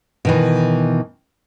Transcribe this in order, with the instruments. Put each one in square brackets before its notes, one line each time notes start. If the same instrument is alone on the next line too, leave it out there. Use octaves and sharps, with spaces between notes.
[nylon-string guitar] B2 D#3 E3